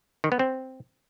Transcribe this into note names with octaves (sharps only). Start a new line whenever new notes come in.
D#3
B3
C4